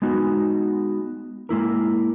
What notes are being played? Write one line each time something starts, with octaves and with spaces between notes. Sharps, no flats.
G#3 B3 D#4 F#4
G#3 A#3 E4 A#4